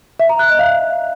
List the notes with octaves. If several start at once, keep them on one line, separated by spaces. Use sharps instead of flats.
E5
A#5
F#6
D#5
F5